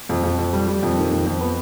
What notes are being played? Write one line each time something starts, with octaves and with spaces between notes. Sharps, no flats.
F2
F2
F2
G3
G3
F2
D#3
F2
F2
B3